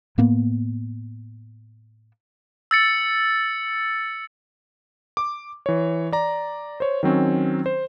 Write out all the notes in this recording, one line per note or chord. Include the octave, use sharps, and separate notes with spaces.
A2 A#3 B3
E6 A6 C#7
D6
E3 C#5
D5 A#5
C5 C#5
D#3 F#3 C4 C#4
C5